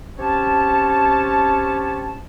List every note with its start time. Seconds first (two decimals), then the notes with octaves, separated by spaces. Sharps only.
0.19 C4 C#4 G4 C#5 A5